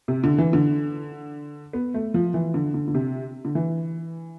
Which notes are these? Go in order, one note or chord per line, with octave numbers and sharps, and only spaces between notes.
C3
D3
E3
D3
B3
A3
F3
E3
D3
D3
D3
C3
D3
E3